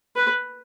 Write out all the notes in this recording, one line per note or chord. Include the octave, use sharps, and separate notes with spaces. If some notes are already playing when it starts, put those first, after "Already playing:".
B4